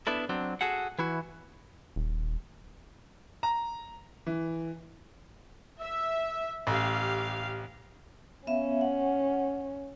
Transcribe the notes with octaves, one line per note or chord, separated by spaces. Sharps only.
B3 D4 E4 A4
F#3 C4 D4
F#4 G#4 A4 F#5
E3 E4 F#4
D#1
A#5
E3
E5
A1 G4 F5
B3 C#4 E5 F5
F#5